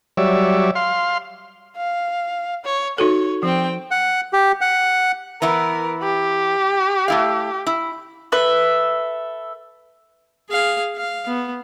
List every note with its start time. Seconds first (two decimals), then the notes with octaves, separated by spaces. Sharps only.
0.17 F#3 G3 C#5 D5 E5
0.75 F5 C6
1.77 F5
2.65 C#5
2.98 D#4 F#4 A4 C#5
3.43 F3 C4 G5
3.91 F#5
4.33 G4
4.61 F#5
5.42 E3 B3 E4 A#4
6.02 G4
7.08 A3 E4 F5
7.67 E4
8.32 A4 B4 E5
10.49 G#4 F5
10.97 F5
11.27 B3